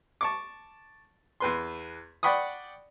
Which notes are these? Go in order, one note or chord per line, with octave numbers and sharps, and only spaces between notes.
A5 C#6 D6
E2 B4 C6
D5 F#5 G5 B5 C#6 D#6